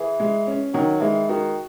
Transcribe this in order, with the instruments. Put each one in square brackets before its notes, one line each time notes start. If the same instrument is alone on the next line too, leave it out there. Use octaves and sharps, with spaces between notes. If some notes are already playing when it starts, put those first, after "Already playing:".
Already playing: [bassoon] E3 [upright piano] G#4
[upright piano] G#3
C#4
[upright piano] D#3 [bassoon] F#3
[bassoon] E3 [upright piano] G#3
[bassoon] D#3 [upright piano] F#4